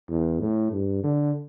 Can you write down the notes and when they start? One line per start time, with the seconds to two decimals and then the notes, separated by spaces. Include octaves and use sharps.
0.10 E2
0.40 A2
0.72 G2
1.04 D3